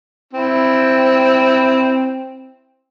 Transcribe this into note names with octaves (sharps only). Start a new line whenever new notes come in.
C4 E4